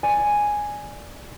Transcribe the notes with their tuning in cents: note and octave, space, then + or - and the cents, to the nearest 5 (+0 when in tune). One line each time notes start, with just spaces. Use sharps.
D5 +0 G#5 +0